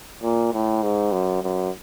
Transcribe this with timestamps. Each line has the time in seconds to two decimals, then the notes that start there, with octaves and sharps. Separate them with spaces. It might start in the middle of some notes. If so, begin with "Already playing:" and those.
0.23 A#2
0.53 A2
0.83 G#2
1.12 F#2
1.43 F#2